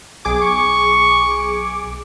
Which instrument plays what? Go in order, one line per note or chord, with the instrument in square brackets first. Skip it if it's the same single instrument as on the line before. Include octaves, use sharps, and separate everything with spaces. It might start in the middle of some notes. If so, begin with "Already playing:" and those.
[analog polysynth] B1 G#4 D6
[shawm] C#6